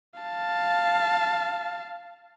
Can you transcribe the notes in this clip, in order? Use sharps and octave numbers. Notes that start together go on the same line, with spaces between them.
F5 A5